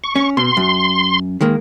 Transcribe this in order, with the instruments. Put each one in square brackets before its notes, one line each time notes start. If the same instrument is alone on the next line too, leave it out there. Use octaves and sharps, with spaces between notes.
[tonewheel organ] C#6
[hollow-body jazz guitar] C#4
[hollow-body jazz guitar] B2 [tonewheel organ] C6
[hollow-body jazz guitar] F#2
D#3 G#3 A#3